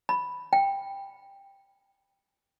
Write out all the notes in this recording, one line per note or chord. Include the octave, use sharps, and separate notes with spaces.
B5
G5